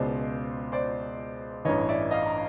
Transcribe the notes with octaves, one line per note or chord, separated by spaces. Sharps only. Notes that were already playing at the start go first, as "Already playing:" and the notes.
Already playing: C#2 B2 G#3 C5 D5
C5 D5
A1 G2 E3 C#5 D#5
D5 E5
D#5 F5
A#5